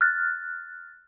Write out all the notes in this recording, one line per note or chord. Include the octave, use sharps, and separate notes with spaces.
F6 F#6 A6